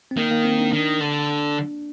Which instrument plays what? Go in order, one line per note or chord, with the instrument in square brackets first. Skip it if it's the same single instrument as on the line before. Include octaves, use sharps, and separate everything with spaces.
[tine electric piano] C4
[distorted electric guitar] D#3 [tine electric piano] A#3
[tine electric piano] A#3
C4
D4
[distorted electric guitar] D#3 [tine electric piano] D4
[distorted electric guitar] D3